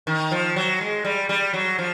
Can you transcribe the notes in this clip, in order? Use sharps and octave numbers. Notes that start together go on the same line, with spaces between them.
D#3
F3
F#3
G#3
G3
G3
F#3
F3